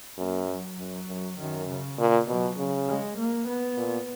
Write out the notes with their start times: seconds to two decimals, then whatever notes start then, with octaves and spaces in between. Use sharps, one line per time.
0.18 F#2 A#3
0.48 F#3
0.78 F#2
1.07 F#2
1.38 F#2 D#3
1.68 C#3
1.98 A#2
2.28 B2 F#3
2.57 C#3
2.88 G#3
3.17 A#3
3.47 B3
3.77 A#2